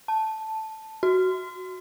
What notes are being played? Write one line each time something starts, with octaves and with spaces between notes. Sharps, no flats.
A5
F#4